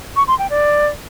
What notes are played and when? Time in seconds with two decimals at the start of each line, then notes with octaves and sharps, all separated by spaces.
0.16 C#6
0.28 C6
0.39 G5
0.50 D5